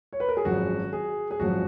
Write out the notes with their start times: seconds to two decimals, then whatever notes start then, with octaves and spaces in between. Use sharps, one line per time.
0.13 C#5
0.20 B4
0.29 A#4
0.37 G#4
0.45 G#1 F#2 F3 G#3 F#4
0.93 G#4
1.31 G#4
1.40 G#1 F#2 F3 G#3 F#4